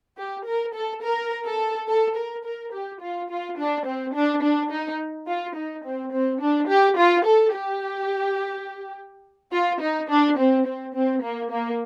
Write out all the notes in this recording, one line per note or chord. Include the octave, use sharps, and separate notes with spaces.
G4
A#4
A4
A#4
A4
A4
A#4
A#4
G4
F4
F4
D4
C4
D4
D4
D#4
F4
D#4
C4
C4
D4
G4
F4
A4
G4
F4
D#4
D4
C4
C4
C4
A#3
A#3